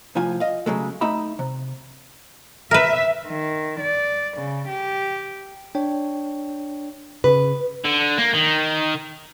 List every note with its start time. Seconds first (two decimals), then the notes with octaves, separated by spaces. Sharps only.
0.15 C2 A2 F3 F4 G#5
0.40 D#5 F5
0.66 C#3 F#3 G#3 A3
1.01 A3 D#4 D#5 E5 B5
1.39 C3
2.71 A#4 B4 E5
3.27 D#3
3.80 D5
4.37 C#3
4.68 G4
5.75 D4 C#5 G5
7.24 C#3 B4
7.84 D3
8.17 A#3
8.33 D#3